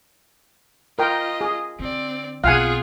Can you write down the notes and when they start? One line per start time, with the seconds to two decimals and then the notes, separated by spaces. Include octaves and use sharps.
0.99 F4 A#4 D#5 G5
1.41 G#4
1.79 D3 C4 D5
2.44 B1 C4 F4 G#4 F5 F#5 G#5